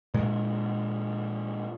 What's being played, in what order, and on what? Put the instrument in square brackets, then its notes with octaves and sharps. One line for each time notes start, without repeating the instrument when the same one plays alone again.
[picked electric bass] A#2 G#3